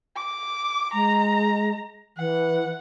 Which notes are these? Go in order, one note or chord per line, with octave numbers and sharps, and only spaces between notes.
D6
G#3 A#5
E3 F#5